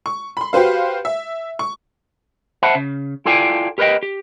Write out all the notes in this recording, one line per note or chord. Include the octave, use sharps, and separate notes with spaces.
C#6
B5 C6
F#4 G4 B4 C5 F5
E5
C#6
C5 E5 F#5 A5 B5
C#3
E4 F4 A4 D5 G5 G#5
G4 A#4 B4 C#5 D#5 G5
G4